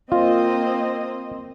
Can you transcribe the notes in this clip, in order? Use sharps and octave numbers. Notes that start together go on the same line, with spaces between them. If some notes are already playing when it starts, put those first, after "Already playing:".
A#3 C4 F4 D#5